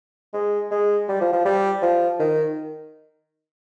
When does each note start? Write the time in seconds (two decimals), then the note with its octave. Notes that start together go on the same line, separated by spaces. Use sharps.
0.34 G#3
0.71 G#3
1.09 G3
1.21 F3
1.33 F3
1.45 G3
1.82 F3
2.19 D#3